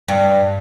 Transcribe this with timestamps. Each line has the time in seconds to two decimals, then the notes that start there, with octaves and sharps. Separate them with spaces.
0.08 G2